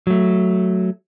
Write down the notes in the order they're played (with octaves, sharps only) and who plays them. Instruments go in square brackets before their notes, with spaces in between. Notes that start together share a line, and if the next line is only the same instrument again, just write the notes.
[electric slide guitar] F#3 A3